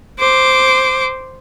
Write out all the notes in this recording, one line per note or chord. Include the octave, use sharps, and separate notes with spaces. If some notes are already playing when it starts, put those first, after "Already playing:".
C5 D6